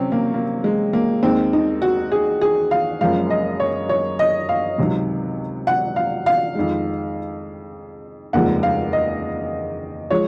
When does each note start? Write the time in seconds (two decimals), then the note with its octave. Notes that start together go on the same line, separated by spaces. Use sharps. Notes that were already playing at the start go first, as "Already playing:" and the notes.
Already playing: C3 F#3 C4 C#4
0.12 A#3
0.34 A#3
0.64 G#3
0.93 A#3
1.23 D#2 D#3 G#3 C4
1.53 D#4
1.82 F#4
2.12 G#4
2.41 G#4
2.71 F5
3.01 F#1 F#2 F3 G#3 F5
3.30 D#5
3.60 C#5
3.89 C#5
4.19 D#5
4.49 F5
4.78 C#2 C3 D#3 F#3
5.67 F#5
5.96 F5
6.26 F5
6.55 F2 D#3 G#3
8.33 F1 D#2 C#3 F3 G#3 F#5
8.63 F5
8.93 D#5
10.10 F3 G#3 C#5